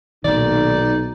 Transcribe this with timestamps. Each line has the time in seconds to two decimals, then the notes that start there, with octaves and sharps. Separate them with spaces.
0.24 B1 A#2 D#3 D#4 D5